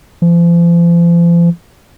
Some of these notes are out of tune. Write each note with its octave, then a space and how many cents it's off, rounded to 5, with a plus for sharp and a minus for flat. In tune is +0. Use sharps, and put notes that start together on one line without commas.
F3 -40